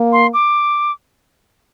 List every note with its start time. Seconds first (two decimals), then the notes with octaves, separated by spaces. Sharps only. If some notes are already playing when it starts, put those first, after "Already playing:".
Already playing: A#3
0.13 C6
0.34 D6